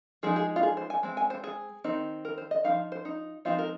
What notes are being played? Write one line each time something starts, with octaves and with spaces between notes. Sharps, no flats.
F3 G#3 D#4 G#4
G#4
F4
G#4
C5
G#5
G#3 C4
G#5
C5
G#4
D#3 C4 D#4
A#4
C5
D#5
F3 C4 D#4 F5
C5
D#4
F3 G#3 C4 D#4 F4
A#4